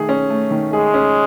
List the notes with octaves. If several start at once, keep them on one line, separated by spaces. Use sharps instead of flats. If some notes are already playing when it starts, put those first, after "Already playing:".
Already playing: D#3 A3 G#4
C#4
A3
D#3
G#3 G#4
C#4